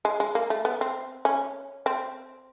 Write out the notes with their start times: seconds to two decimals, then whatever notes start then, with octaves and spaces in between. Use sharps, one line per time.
0.05 G#3
0.20 G#3
0.35 A#3
0.50 A3
0.65 B3
0.81 C4
1.25 C#4
1.86 C4